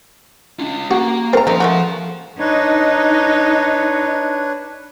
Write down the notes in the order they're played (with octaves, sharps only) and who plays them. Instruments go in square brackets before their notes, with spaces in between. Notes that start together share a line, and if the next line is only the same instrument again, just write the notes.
[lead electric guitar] C#4 F4
[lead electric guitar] A#3 A#4 [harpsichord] F#4
[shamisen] A3 A#5 [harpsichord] C4 A#4
[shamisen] C#3 A3 D#4 [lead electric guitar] F3 C6
[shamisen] G#3 A3 F#4
[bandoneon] D4 B4 C#5 [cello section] D#4